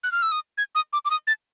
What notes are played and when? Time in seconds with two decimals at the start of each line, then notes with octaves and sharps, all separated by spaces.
0.04 F#6
0.12 F6
0.22 E6
0.32 D#6
0.58 G#6
0.75 D#6
0.93 D6
1.05 D6
1.10 D#6
1.27 A6